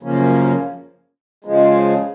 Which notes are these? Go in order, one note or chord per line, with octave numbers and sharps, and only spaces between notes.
F#2 C#3 F3 A#3 C#4
C#3 F3 G#3